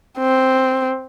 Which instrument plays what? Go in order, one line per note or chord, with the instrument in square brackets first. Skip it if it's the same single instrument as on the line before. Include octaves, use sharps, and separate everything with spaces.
[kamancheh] C4